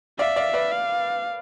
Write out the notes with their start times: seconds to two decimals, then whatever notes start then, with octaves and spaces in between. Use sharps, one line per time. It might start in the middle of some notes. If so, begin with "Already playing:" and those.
0.19 D5 E5 F5
0.36 D5 F5
0.53 B4 D5
0.72 F5